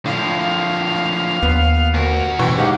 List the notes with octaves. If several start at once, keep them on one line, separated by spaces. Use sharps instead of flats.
A2 D3 F3 F5
D#2 B3
D2 F#4 A#4
F#2 B2 E3 G5 C#6
G#3 D#4 G4 F5 F#5